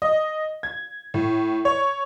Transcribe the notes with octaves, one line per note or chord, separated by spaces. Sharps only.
D#5
G#6
A2
C#5